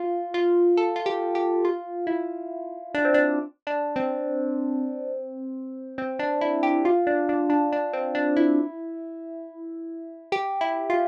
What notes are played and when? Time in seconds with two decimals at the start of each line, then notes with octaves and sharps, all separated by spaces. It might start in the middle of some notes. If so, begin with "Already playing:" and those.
Already playing: F4
0.34 F4
0.77 A4
0.96 F4
1.06 G4
1.35 G4
1.65 F4
2.07 E4
2.94 D4
3.05 C4
3.14 D4
3.67 D4
3.96 C4
5.98 C4
6.19 D4
6.41 E4
6.63 G4
6.85 F4
7.07 D4
7.29 D4
7.50 D4
7.72 D4
7.93 C4
8.15 D4
8.36 E4
10.32 G4
10.61 E4
10.90 F4